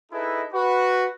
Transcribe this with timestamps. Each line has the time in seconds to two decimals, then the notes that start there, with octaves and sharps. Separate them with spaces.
0.12 D#4 E4 G#4 A4 B4 D#5
0.52 F#4 B4